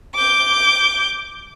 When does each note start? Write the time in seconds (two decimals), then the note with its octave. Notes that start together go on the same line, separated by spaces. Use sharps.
0.15 D6 G6